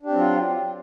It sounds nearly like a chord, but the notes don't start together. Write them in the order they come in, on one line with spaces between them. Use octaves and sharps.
D4 G4 C4 F#3 F4